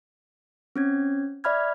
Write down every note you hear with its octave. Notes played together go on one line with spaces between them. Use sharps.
C4 C#4 G#6
D5 E5 B5 F6 G#6